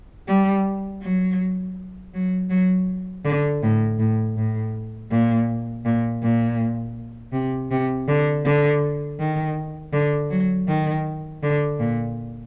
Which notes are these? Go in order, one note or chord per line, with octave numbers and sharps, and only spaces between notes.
G3
F#3
F#3
F#3
D3
A2
A2
A2
A#2
A#2
A#2
C3
C3
D3
D3
D#3
D3
F#3
D#3
D3
A#2